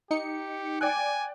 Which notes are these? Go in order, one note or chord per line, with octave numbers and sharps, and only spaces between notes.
D#4 G4 C#7
D5 G5 G#5 F#6